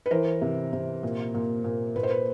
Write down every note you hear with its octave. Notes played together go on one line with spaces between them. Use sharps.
B4
E3 A#4 C5
C3
C3
A#2
A#2
A#2
A#2 B4
C5
B4